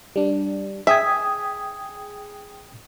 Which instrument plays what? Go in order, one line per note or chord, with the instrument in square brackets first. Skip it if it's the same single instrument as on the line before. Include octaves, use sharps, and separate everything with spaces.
[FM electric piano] G3 D4
[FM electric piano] G#4 [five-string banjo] E5 [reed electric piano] G5 D#6 G#6